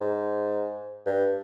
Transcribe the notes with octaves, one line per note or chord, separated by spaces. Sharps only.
G#2
G2